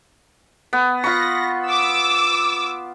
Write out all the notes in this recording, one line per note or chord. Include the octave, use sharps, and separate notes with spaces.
B3
F4 B5 C#6 A#6
D6 E6